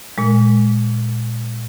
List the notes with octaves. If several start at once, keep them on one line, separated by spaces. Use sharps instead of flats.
A#2 G#3